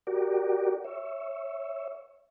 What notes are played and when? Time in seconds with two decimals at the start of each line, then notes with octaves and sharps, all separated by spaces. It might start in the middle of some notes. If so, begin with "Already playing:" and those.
0.07 F#4 G4 A#4 D5
0.84 C#5 E5